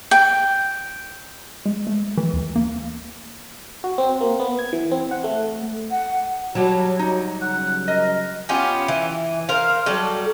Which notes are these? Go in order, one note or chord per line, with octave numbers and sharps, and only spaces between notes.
G5
G#3
A3
E3
D#2
A#3
F#4
C4
A#3
B3
G#6
E3
C4
F#5
A3
F#5
F#3 G3 F#4 A5
D#4
C#3 F#5
A#4 D#5
B3 C#4 F4 G4
E3
A#4 C5 F5
F#3 G3 A4 D5